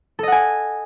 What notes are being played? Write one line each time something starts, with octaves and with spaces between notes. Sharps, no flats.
A4 D#5 F#5 G#5